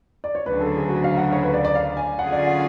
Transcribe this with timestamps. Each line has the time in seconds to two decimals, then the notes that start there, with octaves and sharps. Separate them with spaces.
0.24 D5
0.35 C#5
0.46 D2 C#3 F#3 B4
0.60 A4
0.75 G#4
0.89 F#4
1.04 F5
1.17 F#5
1.32 C#5
1.43 B4
1.54 D5
1.65 D5
1.75 F5
1.97 G#5
2.18 D3 F#3 C#4 F4 G#4 F#5
2.32 D5
2.47 F#5